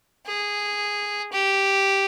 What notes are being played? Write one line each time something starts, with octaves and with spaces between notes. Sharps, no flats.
G#4
G4